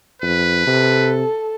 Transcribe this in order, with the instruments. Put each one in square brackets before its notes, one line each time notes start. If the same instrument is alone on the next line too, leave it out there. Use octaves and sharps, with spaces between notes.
[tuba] F2 [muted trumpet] B4
[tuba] C3 [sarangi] A4